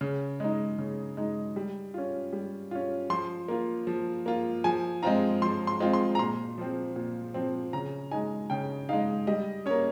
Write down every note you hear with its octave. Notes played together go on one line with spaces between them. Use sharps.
C#3
G#3 D#4
C#3
G#3 D#4
G3
C#4 F4
G3
C#4 F4
F3 C6
A#3 F4
F3
A#3 F4
F3 G#5
G#3 C4 F4 A#5
F3 C6
C6
G#3 C4 F4
C6
A#5
A#2 C6
F3 C4
A#2
F3 C4
C#3 A#5
G#3 D#4 G#5
C#3 G5
G#3 D#4 F5
G3 D#5
A#3 C#4 C#5